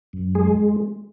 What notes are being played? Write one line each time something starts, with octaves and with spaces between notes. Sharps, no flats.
F#2
G#3 G#4